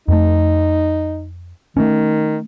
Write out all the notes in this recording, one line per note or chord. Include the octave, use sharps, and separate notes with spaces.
F2 A3 D#4
D#3 A3 B3 C#4